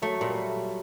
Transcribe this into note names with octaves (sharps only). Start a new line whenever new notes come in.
F#3 A3
A#2 G3